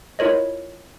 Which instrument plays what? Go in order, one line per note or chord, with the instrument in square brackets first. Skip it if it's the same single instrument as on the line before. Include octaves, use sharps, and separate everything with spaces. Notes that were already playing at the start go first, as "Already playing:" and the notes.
[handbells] E4 F4 A#4 C#5 D#5